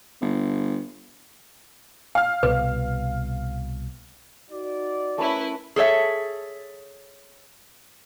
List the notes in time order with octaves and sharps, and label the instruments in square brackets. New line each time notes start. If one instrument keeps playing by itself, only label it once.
[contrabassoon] G1
[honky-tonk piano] F5 F6
[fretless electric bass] C2 B2 [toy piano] B4
[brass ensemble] D#4 F#4 D5
[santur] A3 A#4 B5 [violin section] C#4 E4 B4
[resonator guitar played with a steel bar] G#4 A4 C#5 E5